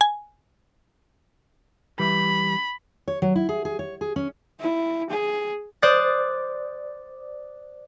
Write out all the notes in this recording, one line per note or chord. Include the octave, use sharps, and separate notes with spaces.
G#5
E3 G3 B4 B5
C#5
F#3
E4
G#4
G#4
C#5
G#4
C#4
E4
G#4
C5 D5 D#6 F#6 A6